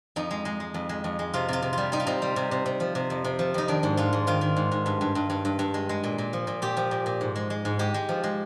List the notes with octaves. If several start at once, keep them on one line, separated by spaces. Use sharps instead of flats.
F2 D#4
G#3
G#3
G#3
F2
G#3
F2
G#3
C3 F4
C3 F4
C3
G3 F4
G3 D#4
F4
C3 D#4
G3
C3
C3
C3
F3
C3
F2
C3
F3
F2 D#4
D#3 D4
G#2
G#2 F4
G#2
D#3 F4
D#3
G#2
G#2
G2
G2
G2
G2
G2
G2
G#3
G#3
A#2
A#2
F3
A#2
A#2 G4
F3
A#2
A#2
G#2
G#3
G#3
G#2
G#3 G4
G#3
F3
G#3